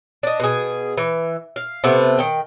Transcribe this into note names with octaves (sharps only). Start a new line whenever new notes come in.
D4 D#5
B2 G#4
E3
F5
C3 A3 B3
D#3 G5